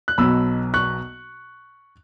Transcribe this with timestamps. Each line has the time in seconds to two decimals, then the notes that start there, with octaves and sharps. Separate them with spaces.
0.08 F#6
0.18 B1 B2 F#3 B5 E6
0.74 C#6 F#6